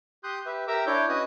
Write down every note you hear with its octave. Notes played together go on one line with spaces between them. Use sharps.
G4 C6 D#6 F#6 G6
G4 B4 E5
G4 A#4 E5 A#5 D6 E6
D4 E4 C#5 D6 G6
C#4 F#4 B4 D#5 D#6 F#6